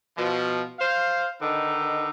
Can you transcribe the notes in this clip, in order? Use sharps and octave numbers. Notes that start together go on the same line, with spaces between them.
B2 F3
C5 F5
D3 D#3 D#4 B4